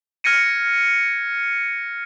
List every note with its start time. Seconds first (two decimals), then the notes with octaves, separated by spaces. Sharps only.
0.24 F6 G#6 A#6 C#7 D#7